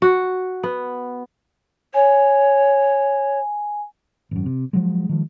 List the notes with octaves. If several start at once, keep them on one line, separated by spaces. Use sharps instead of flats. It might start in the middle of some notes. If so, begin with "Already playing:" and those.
F#4
B3
C#5 G#5
G#1 F#2
C3
F3 F#3 G#3
D#3 F3 G#3